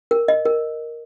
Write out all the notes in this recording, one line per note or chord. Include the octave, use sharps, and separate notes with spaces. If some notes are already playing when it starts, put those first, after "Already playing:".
A#4
D#5
A#4